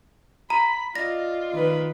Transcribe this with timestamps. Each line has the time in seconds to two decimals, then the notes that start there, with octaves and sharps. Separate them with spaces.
0.50 A#5 B5
0.95 F4 D5 D#5 A#6
1.53 D#3 B4